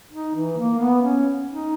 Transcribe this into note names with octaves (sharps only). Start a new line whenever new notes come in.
D#4
E3
A#3
B3
C#4
D#4